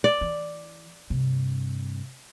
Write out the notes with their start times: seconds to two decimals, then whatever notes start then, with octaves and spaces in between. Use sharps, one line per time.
0.04 D5
0.21 E3
1.10 G2 C3